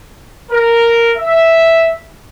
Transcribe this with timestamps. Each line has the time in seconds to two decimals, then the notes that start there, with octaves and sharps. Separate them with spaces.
0.52 A#4
1.17 E5